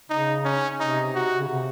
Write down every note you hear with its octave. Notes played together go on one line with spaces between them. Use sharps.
C#3 D#4
C#4
C3 D#4
F#4
C#3
C3